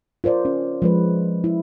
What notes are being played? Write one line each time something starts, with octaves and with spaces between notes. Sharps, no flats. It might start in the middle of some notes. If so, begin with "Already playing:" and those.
F4 A#4 C5 D5
C#4
F3 G#3 B4
E4